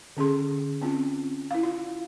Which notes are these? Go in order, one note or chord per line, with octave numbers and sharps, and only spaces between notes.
D3 C#4 G#4 C6
C4 C#4 F4
E4 F5
F4